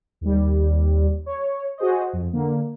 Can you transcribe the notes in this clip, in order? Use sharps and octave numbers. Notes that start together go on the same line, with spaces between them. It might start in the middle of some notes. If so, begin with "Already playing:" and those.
D#2 G3
C#5
F#4 G#4 C5 D#5
F2
D3 A#3